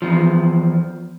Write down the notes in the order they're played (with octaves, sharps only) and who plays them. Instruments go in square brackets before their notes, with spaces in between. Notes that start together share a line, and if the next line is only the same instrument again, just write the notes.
[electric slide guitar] E2 G2 F3